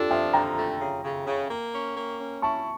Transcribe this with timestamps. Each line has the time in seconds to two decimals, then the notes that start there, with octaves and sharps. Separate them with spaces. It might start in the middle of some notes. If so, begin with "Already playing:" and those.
Already playing: D4 F4 G4 A4
0.10 F3 E5 G5
0.33 D3 G5 A#5
0.57 A3
0.81 C#3
1.04 C#3
1.27 C#3
1.50 A#3
1.73 C#4
1.97 A#3
2.20 C#4
2.42 E4 A5 C#6